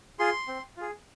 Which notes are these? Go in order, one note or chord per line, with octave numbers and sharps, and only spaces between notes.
F4 G#4 C6
C4
F4 G#4